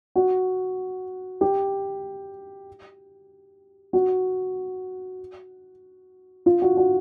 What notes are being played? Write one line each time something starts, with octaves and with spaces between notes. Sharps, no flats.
F#4
G4
F#4
F4
F#4
F#4